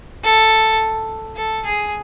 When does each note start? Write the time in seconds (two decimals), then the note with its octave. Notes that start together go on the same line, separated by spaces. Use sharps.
0.24 A4
1.37 A4
1.65 G#4